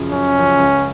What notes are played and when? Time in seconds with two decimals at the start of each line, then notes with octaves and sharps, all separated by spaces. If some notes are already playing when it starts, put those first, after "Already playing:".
Already playing: F#2 C#3 F3
0.11 F#2 C#4
0.34 C#3 F3
0.58 C#2